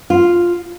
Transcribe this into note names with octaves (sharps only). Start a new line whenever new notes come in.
F4